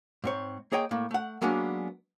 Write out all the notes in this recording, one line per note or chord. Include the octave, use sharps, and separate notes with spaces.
G#2 C4 C#5
A#3 G#4 C#5 D#5 G5
A2 A#3
A3 F#5
F#3 G#3 A#3 B3 C#4 D4